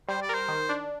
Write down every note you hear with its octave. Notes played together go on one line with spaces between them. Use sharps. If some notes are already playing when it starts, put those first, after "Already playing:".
G3 C5
D5
A#4 C5
D#3
D4